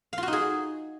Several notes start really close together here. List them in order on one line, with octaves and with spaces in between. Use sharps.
F5 F4 F#4 D#4 G#4